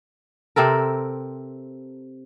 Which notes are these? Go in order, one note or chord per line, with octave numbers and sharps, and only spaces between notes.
C3 C4 A4 A#4